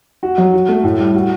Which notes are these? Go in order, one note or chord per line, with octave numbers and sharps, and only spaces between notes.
F#4
F#3
F#4
A3
A2
G3
F#4